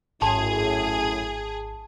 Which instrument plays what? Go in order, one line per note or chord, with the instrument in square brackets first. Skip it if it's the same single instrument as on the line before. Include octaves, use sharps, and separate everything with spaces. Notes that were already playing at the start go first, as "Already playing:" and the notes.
[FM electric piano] G#1 [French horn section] F#2 A2 [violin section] G#4 [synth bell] A5